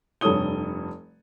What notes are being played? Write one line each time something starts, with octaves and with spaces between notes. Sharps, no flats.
F1 G2 A4 C#5 D#6 G7